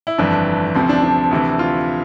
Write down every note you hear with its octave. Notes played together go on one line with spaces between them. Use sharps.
E4
G1 F2 E3 D4
D2 C3 F3 C4
D4
D4
D2 C3 E3
F4